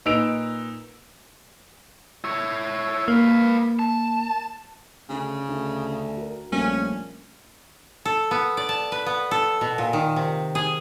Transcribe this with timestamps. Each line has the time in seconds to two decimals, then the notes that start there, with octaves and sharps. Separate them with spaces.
0.06 A#2 D#4 B4 E6 D7 F7
2.24 E4 C#5
3.08 A#3 B4 F5
3.79 A5
5.09 D2 C#3
5.48 D2
6.17 F#4 A#4
6.52 A#1 G3 A3 C#4
8.05 A4
8.31 B3
8.57 D5
8.69 A5
8.92 B4
9.06 B3
9.31 A4
9.61 B2
9.78 A#2
9.93 D#3
10.16 C3
10.55 G#4